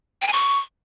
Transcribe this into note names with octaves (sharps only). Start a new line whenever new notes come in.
G5
G#5
C#6